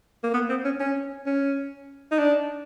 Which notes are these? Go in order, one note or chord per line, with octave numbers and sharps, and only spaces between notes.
A#3
B3
C4
C#4
C#4
C#4
D#4
D4